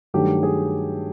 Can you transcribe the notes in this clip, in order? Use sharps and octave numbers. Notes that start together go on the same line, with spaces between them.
G2 D#3 F#3 A3 D4 G4
G#4